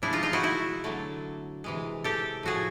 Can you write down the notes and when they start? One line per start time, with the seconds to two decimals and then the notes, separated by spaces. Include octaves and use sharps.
0.02 C3 F3 G#3 D4 E4
0.13 D#4 F4
0.23 D#4 F4
0.33 E4 F#4
0.43 E4 F#4
0.84 D3 F#3 A3
1.64 C3 E3 G#3
2.04 G4 A4
2.43 A2 F3 A3 F#4 G#4